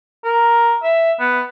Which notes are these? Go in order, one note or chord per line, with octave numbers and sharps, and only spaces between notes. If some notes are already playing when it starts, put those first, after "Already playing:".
A#4
E5
B3